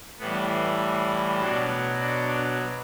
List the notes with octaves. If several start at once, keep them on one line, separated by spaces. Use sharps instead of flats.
A2 E3 G3 B3
B2 F#3 D4
D4